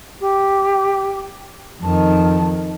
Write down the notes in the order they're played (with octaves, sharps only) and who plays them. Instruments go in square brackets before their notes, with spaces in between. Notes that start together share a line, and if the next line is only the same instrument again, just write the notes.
[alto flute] G4
[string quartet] F2 D#3 [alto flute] A5